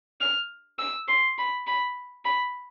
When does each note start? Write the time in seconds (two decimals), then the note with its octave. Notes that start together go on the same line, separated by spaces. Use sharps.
0.21 F6
0.79 E6
1.08 C6
1.38 B5
1.67 B5
2.25 B5